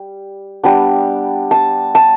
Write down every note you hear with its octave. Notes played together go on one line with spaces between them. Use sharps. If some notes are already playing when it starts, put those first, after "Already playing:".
Already playing: G3
G3 B3 D4
A5
A5